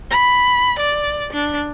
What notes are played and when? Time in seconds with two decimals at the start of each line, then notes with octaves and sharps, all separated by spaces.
0.11 B5
0.79 D5
1.33 D4